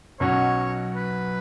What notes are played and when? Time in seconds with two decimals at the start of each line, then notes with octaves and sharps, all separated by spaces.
0.20 B1 B2 F#3 C#4 F#4 C#5
0.95 B4